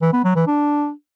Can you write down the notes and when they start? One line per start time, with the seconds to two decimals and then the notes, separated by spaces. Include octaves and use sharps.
0.02 E3
0.13 B3
0.24 F#3
0.36 E3
0.47 D4